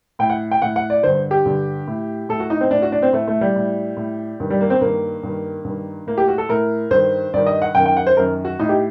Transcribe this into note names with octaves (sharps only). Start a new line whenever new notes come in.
A2 G5
F#5
G5
A2 F#5
F#5
D5
G2 D3 C5
G4
G2 D3
A2
A2 A4
F#4
D#4
C4
A2 D4
F#4
D4
C4
A2 A3
A3
G3
A2
A2
G2 D#3
G3
A#3
C4
G2 D#3 A#3
G2 D#3
G2
D#3
A2 A#3
G4
F#4
A4
A2 A#4
G2 D#3 C5
G2 D#3 D5
D#5
F#5
F#2 D#3 G5
G5
F#5
C5
F#2 D#3 A#4
F#4
A2 D#4
G4